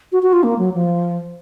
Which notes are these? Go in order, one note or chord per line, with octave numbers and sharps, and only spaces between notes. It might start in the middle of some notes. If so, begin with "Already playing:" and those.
F#4
F#4
F4
A#3
F#3
F3